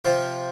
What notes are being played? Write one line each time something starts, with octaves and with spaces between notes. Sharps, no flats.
C3 F3 F4